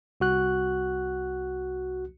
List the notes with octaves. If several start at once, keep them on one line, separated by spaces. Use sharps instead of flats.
C2 F#4 F#6